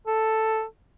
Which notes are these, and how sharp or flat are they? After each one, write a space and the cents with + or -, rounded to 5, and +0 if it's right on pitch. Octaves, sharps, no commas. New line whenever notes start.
A4 +5